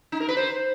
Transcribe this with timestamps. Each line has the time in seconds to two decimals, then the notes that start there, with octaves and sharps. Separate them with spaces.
0.12 D#4
0.20 A#4
0.29 B4
0.37 C5